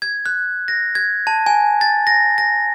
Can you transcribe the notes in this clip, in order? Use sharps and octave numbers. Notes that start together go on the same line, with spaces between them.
G#6
F#6
A#6
G#6
A5
G#5
A6
A#6
A#6